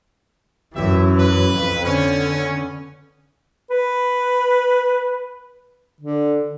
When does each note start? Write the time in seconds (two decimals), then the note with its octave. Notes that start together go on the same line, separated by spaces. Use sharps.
0.74 F#2 E3 G4 E5
1.17 B4
1.54 F2
1.84 D3 B3 C#4
3.70 B4
6.01 D3